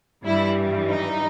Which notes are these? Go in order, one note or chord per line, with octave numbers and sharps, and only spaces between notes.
G2 E3 G3 E4
D#4